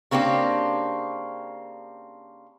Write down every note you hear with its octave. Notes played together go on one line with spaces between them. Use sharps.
C#3 A#3 C4 D4 G4